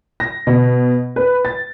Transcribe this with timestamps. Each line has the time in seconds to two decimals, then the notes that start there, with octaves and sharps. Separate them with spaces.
0.20 A#6
0.47 B2
1.16 B4
1.45 A6